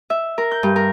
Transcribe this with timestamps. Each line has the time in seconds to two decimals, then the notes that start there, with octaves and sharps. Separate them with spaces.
0.10 E5
0.38 A#4
0.51 G6
0.63 G2
0.76 A#4